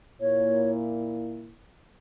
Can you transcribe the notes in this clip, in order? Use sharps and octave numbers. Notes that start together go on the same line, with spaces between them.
A#2 A#3 E4 C#5